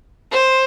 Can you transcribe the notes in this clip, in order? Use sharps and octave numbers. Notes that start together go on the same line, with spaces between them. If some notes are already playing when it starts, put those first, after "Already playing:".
C5